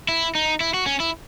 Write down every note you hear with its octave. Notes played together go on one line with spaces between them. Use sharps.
E4
D#4
E4
F#4
C#4
E4